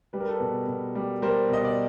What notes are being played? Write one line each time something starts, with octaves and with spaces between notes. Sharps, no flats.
G3 B4
A#4
A4 B4
B2
B2
G3
G3 A#4 C5
B2 D#5
D5